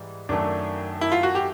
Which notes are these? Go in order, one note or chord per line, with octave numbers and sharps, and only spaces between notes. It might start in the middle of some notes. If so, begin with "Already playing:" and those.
Already playing: G#2 E3 G3
F#2 D#3 F#3 A3 D4
E4
F4
F#4
G4